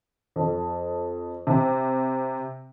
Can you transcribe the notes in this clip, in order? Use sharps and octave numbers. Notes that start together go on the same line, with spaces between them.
F2
C3